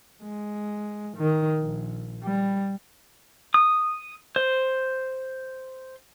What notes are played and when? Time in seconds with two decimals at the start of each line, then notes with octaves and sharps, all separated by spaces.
0.23 G#3
1.17 D#3
1.59 A#1
2.24 G3
3.54 D#6
4.36 C5